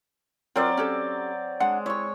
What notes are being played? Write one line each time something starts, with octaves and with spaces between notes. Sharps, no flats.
F#3 C4 F4 A#4 C5 D5
C#4 G4 A4
G#3 D4 F#5
E4 C#5 C#6